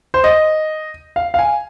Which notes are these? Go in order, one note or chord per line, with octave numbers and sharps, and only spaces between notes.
C5
D#5
F5
F5
G#5